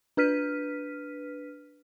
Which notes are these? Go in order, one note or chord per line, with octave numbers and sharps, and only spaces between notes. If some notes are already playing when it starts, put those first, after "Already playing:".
D4 B4 F6 B6 D#7